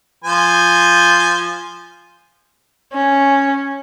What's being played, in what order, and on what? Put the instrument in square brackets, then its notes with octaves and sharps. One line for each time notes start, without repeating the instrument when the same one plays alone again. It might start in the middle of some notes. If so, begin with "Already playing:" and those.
[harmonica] F3 C5 G#5
[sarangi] C#4